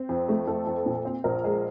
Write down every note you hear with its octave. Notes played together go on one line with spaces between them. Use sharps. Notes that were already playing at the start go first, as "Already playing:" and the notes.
Already playing: C4
F2
A3
F2 A4
F2
A#2
C4
A#1 A#4
G#3